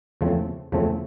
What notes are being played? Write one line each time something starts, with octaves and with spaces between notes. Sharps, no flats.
E2 C#3 F3 A3 C4
E2 C#3 F3 A3 C4